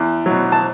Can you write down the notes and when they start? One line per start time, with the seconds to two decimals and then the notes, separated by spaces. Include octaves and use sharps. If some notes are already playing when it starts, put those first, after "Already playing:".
Already playing: E2
0.26 B2 F#3
0.52 A5